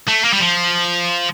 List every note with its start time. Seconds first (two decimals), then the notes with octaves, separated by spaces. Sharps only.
0.08 A3
0.24 A#3
0.33 G3
0.40 F3